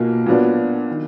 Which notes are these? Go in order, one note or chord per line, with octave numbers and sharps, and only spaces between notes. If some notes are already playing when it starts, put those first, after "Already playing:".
Already playing: B1 B2 A#3 F4
A#2 F#3 B3 D4 F4
D#3